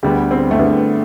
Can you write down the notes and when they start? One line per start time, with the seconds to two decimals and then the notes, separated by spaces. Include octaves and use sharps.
0.03 D2 D3 G3 B3 G4
0.31 C4
0.51 A3
0.59 D3 G3 B3